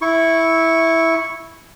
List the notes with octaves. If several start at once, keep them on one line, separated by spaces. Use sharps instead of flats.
E4 C#6